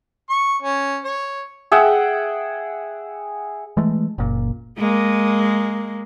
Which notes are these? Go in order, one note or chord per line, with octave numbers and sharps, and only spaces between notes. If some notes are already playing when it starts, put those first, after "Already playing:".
C#6
C#4
C#5
G#4 E5 F#5 G5
E3 G#3 A3
F#1 A#2
G#3 A#3